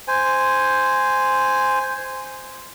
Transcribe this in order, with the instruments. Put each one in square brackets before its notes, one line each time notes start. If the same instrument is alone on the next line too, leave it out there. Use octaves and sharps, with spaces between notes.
[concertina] C5 G#5